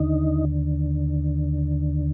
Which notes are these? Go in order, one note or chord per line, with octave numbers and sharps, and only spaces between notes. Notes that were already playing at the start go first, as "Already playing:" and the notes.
Already playing: D#2 D3 D#4